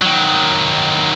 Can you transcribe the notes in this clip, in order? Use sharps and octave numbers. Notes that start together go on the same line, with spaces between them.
D#3 F#3